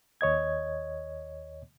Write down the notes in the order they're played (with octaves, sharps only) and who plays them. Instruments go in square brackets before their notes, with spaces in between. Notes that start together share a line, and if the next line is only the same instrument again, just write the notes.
[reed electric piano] D#2 C#5 D#5 G#6